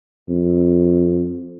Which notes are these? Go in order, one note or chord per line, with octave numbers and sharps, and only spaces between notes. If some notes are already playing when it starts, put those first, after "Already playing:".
F2